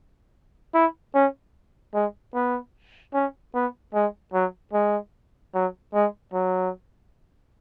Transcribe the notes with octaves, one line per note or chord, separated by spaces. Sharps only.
E4
C#4
G#3
B3
C#4
B3
G#3
F#3
G#3
F#3
G#3
F#3